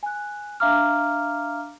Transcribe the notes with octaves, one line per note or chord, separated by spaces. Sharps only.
G#5 F#6
D4 E5 F5 A#5 D6 F6